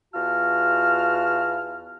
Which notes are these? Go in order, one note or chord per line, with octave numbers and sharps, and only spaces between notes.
E2 F4 F#4 A5 F6